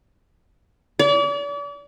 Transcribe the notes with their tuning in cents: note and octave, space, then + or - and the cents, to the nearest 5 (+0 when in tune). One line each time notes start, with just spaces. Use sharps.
D5 -40